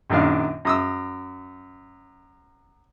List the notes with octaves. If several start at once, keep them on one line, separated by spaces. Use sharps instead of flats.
A#1 F#2 D#3 D4 F5
F#2 D#6 E6